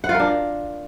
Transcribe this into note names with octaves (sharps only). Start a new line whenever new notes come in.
F#5
F4
A#4
D4